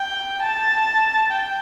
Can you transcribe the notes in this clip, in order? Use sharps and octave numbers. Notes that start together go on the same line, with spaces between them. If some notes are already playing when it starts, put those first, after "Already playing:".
Already playing: G5
A5
G5